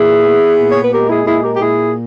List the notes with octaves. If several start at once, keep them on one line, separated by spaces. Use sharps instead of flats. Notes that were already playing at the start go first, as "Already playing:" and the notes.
Already playing: A#2 E4 G#4
B3
A#2
C#5
B4
G#3 G4 A#4
E4 G#4
A#2 E4 G#4
G4 A#4
G4
A#2 E4 G#4